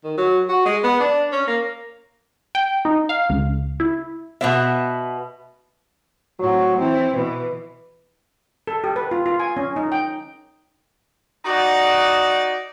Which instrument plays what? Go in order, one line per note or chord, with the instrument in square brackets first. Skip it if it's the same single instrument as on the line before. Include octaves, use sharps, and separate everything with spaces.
[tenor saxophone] D#3
F#3
F#4
G#3
B3
D4
C#4
A#3
[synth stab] G5
D#4
F5
C#2
E4
[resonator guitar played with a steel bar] B2 B3 E5
[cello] A2 C4 [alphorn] F#3
[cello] E3 E4 [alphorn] C4
[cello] B2 E3 [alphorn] B4
[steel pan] A4
G4
B4
F4
F4
G#5
C#4
D#4
G5
[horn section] D#4 F#4 D5